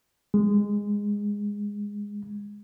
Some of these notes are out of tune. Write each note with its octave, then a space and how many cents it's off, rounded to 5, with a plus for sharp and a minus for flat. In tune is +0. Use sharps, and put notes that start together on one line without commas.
G#3 -15